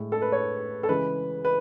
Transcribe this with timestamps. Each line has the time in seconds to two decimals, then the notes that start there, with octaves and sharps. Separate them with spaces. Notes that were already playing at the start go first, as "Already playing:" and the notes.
Already playing: A2 G#3
0.12 A4
0.22 B4
0.32 C#5
0.83 A4
0.89 C#3 E3 G#3 B4
1.45 B4